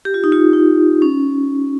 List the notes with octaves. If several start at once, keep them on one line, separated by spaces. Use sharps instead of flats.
G4
F4
D#4
F4
D#4
C#4